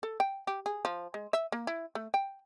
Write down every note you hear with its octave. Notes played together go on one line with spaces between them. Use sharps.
A4
G5
G4
G#4
F3
G#3
E5
A#3
E4
A3
G5